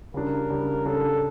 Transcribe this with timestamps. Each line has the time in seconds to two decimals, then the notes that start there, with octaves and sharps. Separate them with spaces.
0.14 C#3 G3 D4 A#4
0.50 C#3 G3 D4
0.86 C#3 G3 D4 A4